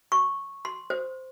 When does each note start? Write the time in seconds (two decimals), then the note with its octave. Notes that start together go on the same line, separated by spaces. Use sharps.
0.12 C#6
0.65 C6
0.90 C5